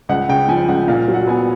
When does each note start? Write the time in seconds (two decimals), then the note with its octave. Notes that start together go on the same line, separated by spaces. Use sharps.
0.09 C#2 F#5
0.29 C#3 G5
0.48 F3 G#5
0.68 C#2 F#5
0.88 A#2 F5
1.08 F#3
1.14 F#5
1.27 B3 G#5